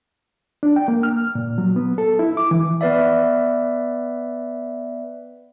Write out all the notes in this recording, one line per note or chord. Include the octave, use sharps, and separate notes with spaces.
D4
G5
A#3
F6
A#2
F#3
B3
A4
E4
D6
E3
B3 B4 D5 E5